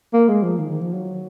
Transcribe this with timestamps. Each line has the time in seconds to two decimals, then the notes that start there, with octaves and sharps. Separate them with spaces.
0.14 A#3
0.28 G#3
0.43 F3
0.59 D#3
0.71 D#3
0.81 F3
0.94 F#3